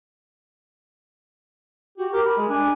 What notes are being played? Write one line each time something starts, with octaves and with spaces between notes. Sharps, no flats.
F#4 G4
G4 A#4
B5
G#3
D4 G#5